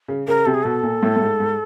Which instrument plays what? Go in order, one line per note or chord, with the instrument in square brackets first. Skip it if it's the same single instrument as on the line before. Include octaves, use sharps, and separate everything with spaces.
[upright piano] C#3
[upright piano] C#3 [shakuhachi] A#4
[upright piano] C3 [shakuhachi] A4
[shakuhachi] G#4
[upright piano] B2 [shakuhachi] A4
[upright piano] A#2
A2
A2
G#2
G#2